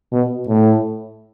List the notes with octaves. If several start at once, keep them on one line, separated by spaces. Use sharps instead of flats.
B2
A2